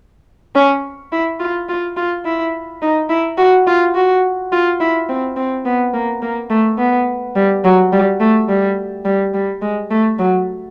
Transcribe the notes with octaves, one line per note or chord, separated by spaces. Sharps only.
C#4
E4
F4
F4
F4
E4
D#4
E4
F#4
F4
F#4
F4
E4
C4
C4
B3
A#3
A#3
A3
B3
G3
F#3
G3
A3
G3
G3
G3
G#3
A3
F#3